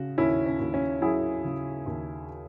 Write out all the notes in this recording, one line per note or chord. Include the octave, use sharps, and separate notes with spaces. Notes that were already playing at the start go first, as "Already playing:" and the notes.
Already playing: C#3 F#4
D#2 C#4 E4
C#4
D#2
C#4
F#3 E4 G#4
C#3
D#2